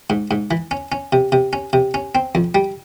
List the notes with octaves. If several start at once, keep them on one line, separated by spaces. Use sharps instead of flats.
G#2
G#2
E3
C#4
C#4
C3
C3
C#4
C3
C#4
C4
F2
G3